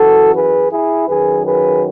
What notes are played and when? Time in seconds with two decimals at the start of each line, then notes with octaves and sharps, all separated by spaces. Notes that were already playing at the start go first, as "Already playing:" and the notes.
Already playing: F#2 E3 F#4 A4
0.33 G#4 B4
0.71 E4 G#4
1.07 F#2 D#3 F#3 G#4 B4
1.44 G#4 B4